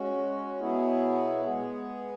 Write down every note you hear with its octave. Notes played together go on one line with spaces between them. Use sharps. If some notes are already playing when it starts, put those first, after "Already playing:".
Already playing: G#3 C#4 F#4
B2 F#3 B3 E4 G#4
G#3 B3 G#4